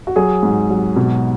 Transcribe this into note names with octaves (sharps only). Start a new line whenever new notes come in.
F#4
F#3 G#4
G#2
F#3
B2